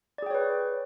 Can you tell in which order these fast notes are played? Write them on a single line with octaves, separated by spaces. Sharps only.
D5 G#4 G5 C#5 B4